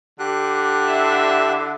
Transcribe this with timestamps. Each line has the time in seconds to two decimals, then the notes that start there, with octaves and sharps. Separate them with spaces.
0.19 D3 G4 F#6
0.86 E4 D5 E5